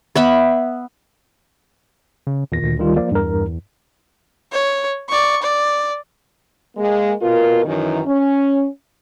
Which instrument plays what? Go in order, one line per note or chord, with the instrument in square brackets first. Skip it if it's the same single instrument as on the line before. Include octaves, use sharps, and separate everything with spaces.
[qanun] B3 E5 B5
[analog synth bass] C#3
[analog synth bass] E2 [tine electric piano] A#2 D#3 A#6
[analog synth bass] D2
[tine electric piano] D#3 G3 F4
F3 A#3 D5
[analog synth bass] E2 [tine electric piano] G2 A#4
[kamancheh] C#5
D5 C#6
D5
[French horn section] G#3 A#3
B2 F4 A#4
F#2 D#3 E3
C#4